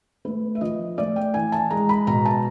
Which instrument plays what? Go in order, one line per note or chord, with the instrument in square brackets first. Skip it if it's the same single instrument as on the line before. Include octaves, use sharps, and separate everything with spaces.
[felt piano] A3 B4
E5
F3 D#5
A3 D5
G5
E3 G#5
A5
G#3 A#5
B5
B2 A#5
A5